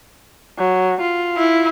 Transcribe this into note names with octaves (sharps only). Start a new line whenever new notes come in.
F#3
F4
E4